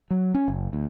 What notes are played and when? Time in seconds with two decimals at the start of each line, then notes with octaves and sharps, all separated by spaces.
0.11 F#3
0.34 C#4
0.48 F#1
0.73 D2